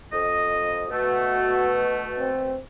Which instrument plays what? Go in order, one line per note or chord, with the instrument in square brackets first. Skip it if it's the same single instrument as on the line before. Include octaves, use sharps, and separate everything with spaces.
[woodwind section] F2 D#5
[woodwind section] B2 A3 [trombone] F#4
[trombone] C4